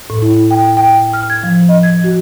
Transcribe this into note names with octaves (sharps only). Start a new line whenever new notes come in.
A2
E4
G5
G5
F6
G#6
F3
D#5
G#6
F#4